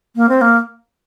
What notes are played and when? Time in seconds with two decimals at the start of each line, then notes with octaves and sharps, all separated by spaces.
0.16 A#3
0.29 C4
0.41 A#3